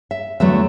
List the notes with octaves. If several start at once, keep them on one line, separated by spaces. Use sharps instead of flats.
E5
E2 D3 F#3 A3 E5